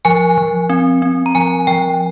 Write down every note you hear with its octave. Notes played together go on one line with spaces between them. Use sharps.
F3 G#5
F3
C4
C4
A#5
F3 G#5
F3 G5